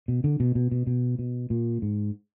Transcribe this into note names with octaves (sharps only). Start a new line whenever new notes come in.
B2
D3
B2
B2
B2
B2
B2
A#2
G#2